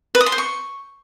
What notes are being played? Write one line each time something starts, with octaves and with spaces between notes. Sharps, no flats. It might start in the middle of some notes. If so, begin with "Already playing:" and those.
B4
D#6
C6
C5
C#6